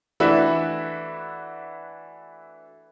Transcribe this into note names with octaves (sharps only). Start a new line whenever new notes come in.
E3 A3 D4 F#4 B4 E5